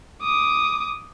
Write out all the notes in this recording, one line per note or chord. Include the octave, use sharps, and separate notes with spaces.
D6 D#6